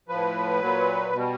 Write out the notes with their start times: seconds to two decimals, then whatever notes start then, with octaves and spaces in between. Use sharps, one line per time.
0.08 A2 F3 B4
0.61 A#2 F#3
1.12 B2 G3